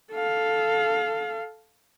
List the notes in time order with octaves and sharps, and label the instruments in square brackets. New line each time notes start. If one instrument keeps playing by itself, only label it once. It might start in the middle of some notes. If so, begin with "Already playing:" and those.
[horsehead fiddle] A4 F5